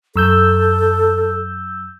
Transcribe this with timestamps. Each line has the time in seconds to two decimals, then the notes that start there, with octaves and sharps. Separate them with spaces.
0.16 F#2 A4 E6 G6